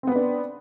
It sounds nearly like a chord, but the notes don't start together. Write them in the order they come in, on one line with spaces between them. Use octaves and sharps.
C4 B3 B4 D4